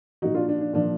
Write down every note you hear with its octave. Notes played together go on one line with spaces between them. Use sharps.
A#2 F3 D#4 F#4
D4 F4
D4
D4
A#2 F3 D4